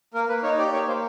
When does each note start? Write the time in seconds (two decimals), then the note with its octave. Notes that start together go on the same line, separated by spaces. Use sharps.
0.14 A#3 A#4
0.29 A#3 B4
0.43 D#4 C#5
0.58 G4 D5
0.73 A#3 C#5
0.88 A#3 C5